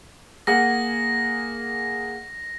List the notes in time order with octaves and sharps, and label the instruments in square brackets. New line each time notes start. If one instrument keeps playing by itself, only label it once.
[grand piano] A#3 G#4 F#5 [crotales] A#6